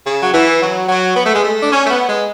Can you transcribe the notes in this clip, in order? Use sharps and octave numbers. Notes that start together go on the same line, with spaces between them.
C#3
F#3
E3
F#3
F#3
B3
A3
G#3
A3
D4
C#4
A3
B3
G#3